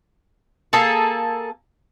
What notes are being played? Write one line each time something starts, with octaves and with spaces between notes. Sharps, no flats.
A#3 G#4 A4